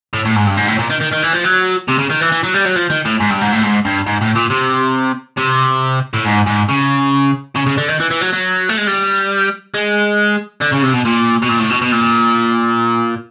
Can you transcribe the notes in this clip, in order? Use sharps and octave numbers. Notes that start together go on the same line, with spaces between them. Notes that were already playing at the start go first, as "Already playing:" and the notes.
A2
A2
G#2
G2
G#2
A2
A#2
D#3
D#3
D#3
E3
F3
F#3
C3
C#3
D#3
E3
E3
F#3
G3
F#3
F3
D#3
A2
G#2
G2
G#2
A2
G#2
G2
G#2
A2
A#2
C3
C3
A2
G#2
G#2
C#3
C#3
C#3
D3
D#3
E3
E3
F#3
F#3
A3
G#3
G3
G#3
D3
C#3
C3
B2
A#2
B2
A#2
A2
B2
B2
A#2